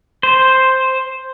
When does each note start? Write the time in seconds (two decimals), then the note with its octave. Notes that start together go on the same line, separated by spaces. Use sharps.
0.23 C5